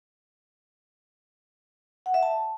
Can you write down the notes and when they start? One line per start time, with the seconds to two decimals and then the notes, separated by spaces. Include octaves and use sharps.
2.06 F#5
2.14 E5
2.23 A5